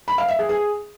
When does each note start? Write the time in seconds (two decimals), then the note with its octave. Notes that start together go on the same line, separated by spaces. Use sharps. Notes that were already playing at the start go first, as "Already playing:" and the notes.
0.08 B5
0.18 F5
0.28 E5
0.39 G#4
0.49 G#4